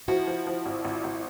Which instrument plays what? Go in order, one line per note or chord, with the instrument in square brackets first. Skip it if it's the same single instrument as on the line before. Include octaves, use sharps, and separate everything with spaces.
[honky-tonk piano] F3 [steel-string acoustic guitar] E4 F#4
[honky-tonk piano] F3
F3
G#1
G#1
G#1